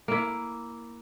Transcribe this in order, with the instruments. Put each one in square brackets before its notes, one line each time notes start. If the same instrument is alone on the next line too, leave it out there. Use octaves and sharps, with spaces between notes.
[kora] A#3 E4